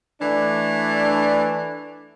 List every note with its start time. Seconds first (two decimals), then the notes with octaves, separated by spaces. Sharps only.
0.21 E3 A3 D4